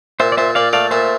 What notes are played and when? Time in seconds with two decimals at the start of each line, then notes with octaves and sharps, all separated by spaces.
0.20 A#2 C5 E5
0.32 D5
0.37 A#2 C5 E5
0.55 A#2 D5 F5
0.73 A3 D5 F5
0.91 A#2 C5 E5